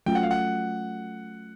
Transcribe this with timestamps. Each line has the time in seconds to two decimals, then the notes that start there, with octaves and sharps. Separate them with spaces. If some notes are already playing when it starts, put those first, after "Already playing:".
0.06 F#3 A3 C#4 F4 G5
0.15 F#5
0.23 F5
0.31 F#5